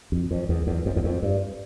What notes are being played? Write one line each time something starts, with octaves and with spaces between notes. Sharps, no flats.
F2
F2
E2
E2
F2
E2
F2
G2